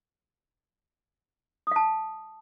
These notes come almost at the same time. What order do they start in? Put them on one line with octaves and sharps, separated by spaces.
D#6 F5 A5